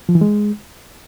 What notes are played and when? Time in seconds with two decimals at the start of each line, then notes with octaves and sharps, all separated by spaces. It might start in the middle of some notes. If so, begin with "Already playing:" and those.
0.09 F3
0.15 E3
0.21 G#3